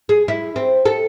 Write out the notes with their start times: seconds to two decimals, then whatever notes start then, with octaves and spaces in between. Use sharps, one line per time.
0.09 G#4
0.28 E4
0.56 C4
0.85 A4